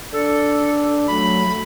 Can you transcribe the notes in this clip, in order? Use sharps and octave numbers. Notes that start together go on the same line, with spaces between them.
D4 A4
F#3 A3 B5